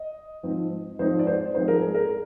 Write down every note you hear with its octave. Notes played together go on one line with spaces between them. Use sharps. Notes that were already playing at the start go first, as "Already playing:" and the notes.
Already playing: D#5
G#2 F3 C4 D#4
G#2 F3 C4 D#4 C5
D5
C5
G#2 F3 C4 D#4 C5
A#4
G#4
A#4